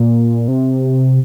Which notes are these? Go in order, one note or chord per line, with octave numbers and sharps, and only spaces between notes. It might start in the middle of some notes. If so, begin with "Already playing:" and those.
Already playing: A#2
C3